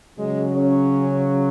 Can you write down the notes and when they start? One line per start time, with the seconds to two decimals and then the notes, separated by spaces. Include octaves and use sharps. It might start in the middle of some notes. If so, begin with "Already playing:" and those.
0.18 C#3 F#3 G#3
0.54 C#4